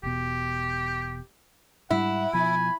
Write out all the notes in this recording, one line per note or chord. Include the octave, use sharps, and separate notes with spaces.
E1 B2 G4
G#2 G3 E4 F#5
B2 F3 G#5 B5